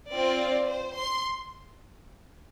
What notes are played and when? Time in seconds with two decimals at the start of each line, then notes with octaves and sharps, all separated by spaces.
0.11 C4 F4 D5
0.68 C5
0.95 C6